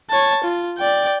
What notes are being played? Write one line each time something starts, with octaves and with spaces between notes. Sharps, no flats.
C#5 A5
F4
D5 G5